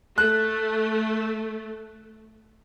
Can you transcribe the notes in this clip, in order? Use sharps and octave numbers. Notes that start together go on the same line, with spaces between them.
A3 F#6